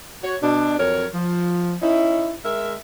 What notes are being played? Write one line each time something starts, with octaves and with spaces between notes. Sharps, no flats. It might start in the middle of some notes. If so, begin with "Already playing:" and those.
F#4 C#5
B2 D4
F2 F#3 A#4 C#5
F3
C#4 D#4 E4
G#3 A#4 E5